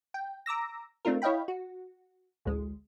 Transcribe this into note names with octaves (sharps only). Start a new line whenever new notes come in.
G5
A#5 D6 E6 A#6
A3 C4 D4 D#4 F4 A#4
E4 C#5 D#5 F5 G5 B5
F#4
A1 D2 G#3